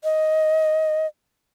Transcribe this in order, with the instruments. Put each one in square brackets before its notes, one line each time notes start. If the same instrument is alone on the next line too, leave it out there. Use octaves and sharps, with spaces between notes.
[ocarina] D#5